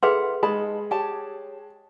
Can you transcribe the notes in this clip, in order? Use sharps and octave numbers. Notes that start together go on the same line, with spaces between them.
E4 G#4 A4 B4 E5 F#5 C6
G#3 D#4 A5 B5
G4 C#5 A5